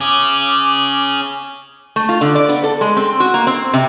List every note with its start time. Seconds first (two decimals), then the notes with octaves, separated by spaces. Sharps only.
0.01 C#4 G#4 D6
1.96 A3
2.09 F4
2.21 D3
2.35 D5
2.49 B3
2.64 A4
2.81 G#3
2.96 C4
3.20 F#4
3.34 A#3
3.47 C4
3.73 C3